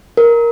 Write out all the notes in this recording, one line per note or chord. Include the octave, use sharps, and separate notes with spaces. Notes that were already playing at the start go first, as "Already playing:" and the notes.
A#4